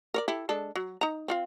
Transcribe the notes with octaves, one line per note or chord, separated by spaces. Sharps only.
A#4 C#5 D5
E4 G4 A4
G#3 D4 A4
F#3
D#4 A#5
C4 F4 F5